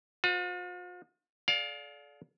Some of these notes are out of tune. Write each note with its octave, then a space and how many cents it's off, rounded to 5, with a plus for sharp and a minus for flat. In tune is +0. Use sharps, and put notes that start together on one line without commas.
F4 +45 C5 -40
A4 -45 D5 -15 F5 +20